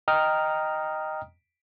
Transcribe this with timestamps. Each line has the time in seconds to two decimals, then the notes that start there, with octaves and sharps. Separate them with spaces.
0.08 D#5 G5 A#5 D#6 F6